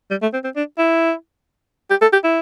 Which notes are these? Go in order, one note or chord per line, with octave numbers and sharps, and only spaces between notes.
G3
A3
C4
C4
D4
E4
G4
A4
G4
E4